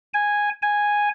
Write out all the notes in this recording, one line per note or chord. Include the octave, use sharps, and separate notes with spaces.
G#5
G#5